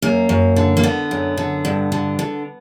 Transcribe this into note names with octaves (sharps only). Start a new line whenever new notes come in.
F#2 A#3
F#2
D3
A#3
D3 B3
F#2
D3
G2
D3
D3